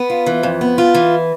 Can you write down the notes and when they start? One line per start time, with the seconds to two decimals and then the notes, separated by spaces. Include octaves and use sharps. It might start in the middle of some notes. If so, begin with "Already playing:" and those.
Already playing: B3
0.10 F4
0.27 E3
0.43 F2
0.61 B3
0.78 F4
0.95 E3